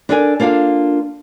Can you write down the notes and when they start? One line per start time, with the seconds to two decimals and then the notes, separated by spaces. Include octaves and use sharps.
0.09 D4 E4 A4 A#4 D5 G#5
0.40 A#3 D4 F4 A4 F5